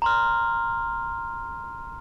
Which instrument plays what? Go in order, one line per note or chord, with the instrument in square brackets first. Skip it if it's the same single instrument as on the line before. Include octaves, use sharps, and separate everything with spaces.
[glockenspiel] A#5 C6 F6